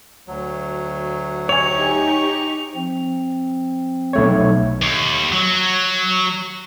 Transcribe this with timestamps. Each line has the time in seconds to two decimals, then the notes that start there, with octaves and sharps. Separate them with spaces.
0.28 D2 F#3
1.49 D#4 G4 C#5 G#5 C#6 F7
2.75 F3 C4
4.13 B1 A3 C#5
4.82 D#2
5.32 F#3